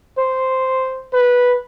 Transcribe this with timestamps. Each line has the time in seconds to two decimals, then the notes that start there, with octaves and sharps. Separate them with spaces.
0.18 C5
1.13 B4